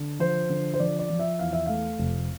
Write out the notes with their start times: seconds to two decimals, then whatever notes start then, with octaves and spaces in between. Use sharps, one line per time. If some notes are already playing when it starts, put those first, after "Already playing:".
Already playing: D3
0.19 F3 C5
0.50 D3
0.74 C5
0.80 F3 D5
0.99 D5
1.10 F3
1.19 E5
1.39 E2 F5
1.53 E5
1.66 A3 F5
1.99 F1